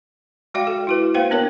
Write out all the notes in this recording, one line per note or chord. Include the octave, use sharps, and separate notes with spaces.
G#3 F#4 D5 F5 G5
A4
E4 F#4 B4
A#3 B4 C5 F5 G5
B3 D4 A#4 C#5